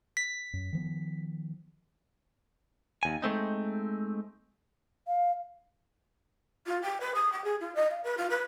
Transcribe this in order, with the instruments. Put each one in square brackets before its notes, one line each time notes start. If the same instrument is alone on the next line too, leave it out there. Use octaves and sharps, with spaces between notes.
[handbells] B6
[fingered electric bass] F#2
D#3 F3 B3
[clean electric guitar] D#2 G#5
G#3 A3 C4 D#4
[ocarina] F5
[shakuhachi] F4
G5
B4
D#6
G5
G#4
F4
D#5
F5
B4
F4
B4